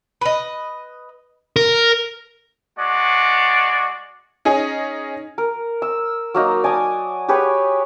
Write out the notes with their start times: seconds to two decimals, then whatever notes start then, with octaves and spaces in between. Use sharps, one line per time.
0.21 B4 D#5
1.56 A#4
2.78 G#3 F#4 D5
4.45 C#4 D#4 G#4
5.38 A#4
5.82 E6
6.34 F#3 A#3 D#4
6.64 D5 G#5 A5 D#6
7.28 G4 G#4 B4 C#5